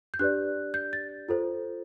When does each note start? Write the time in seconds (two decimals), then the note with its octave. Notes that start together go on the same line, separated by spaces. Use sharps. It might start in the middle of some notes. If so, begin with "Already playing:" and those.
0.14 G6
0.19 D4 G4 B4 D5 F#6
0.74 G6
0.93 A6
1.29 F4 A4 C5